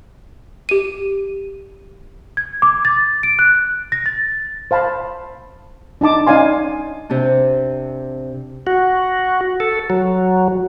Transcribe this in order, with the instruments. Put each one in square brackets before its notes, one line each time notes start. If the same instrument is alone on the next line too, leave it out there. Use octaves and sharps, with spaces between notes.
[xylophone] G4 D#7
[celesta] G#6
D6
A6
D7
F#6
A#6
A6
[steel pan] C5 F5 A5 B5
D4 D#4 A5 D6
C#4 D#4 D5 F5 G#5 C6
[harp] C3 C4 D4
[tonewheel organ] F#4
A4
F#3